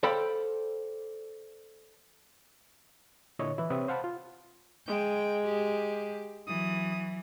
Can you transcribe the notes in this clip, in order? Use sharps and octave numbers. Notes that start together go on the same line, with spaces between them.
A4 C5 D5 F5 G5 B5
A#2 D3 E4 C#5 D#5
E3 E4
C3 C4 B4 C#5 E5 D#6
C5 F5 F#5 A5 B5
F4
G#3 G5
G4
E3 F#3 D#6